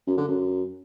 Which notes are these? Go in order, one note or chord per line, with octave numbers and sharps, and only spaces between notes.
F#2
D3
F#2